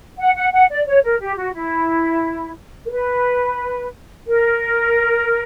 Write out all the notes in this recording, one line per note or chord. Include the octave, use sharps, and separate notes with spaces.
F#5
F#5
F#5
D5
C#5
A#4
G4
F#4
E4
A#4
B4
A#4